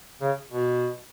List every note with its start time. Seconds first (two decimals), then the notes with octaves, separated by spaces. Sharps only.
0.21 C#3
0.51 B2